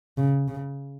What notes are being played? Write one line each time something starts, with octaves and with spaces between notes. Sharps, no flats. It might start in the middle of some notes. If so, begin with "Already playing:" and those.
C#3
C#3